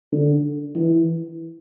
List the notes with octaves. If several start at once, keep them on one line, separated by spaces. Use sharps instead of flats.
D3
E3